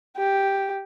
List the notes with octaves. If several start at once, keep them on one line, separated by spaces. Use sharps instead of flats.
G4